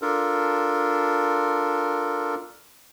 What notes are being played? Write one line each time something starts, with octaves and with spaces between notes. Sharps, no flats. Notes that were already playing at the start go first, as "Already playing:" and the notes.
D4 F4 A4 A#4